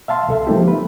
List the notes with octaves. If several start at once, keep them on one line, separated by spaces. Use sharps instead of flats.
E5 F5 A5 C6
C2 A4 E5
F3 G#3 A#3 C4 D#4 G4
B4